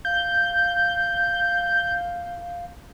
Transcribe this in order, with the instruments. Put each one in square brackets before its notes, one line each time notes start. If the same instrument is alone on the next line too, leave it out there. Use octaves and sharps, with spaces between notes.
[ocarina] F5 [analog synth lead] G6